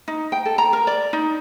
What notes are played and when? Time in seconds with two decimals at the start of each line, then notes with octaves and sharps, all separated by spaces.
0.08 D#4
0.32 G5
0.45 A4
0.58 A#5
0.73 A#4
0.87 D5
1.13 D#4